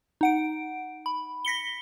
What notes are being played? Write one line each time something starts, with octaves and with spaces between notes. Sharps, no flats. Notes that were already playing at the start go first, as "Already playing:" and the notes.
D#4 F#5 D7
B5
A#6 B6 C#7 G7